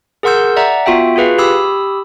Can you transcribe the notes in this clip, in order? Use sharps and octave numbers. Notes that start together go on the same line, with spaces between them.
G#4 A#4 F#5 C6 E6 G6
D5 E5 F#5 A#5
B3 F4 F#4 E5 G5
F4 F#4 G#4 B4 F5
G4 B5 D#6 E6